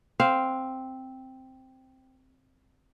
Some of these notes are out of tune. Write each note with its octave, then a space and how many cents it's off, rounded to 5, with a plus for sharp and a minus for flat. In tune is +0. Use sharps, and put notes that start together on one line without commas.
C4 +0 F5 +0